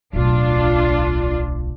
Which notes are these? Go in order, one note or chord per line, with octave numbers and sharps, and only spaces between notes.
D1 B1 D4 F4